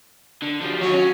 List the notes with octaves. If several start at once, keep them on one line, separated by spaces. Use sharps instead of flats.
D3
F3 G3
D#2 F#3 C#5
C#4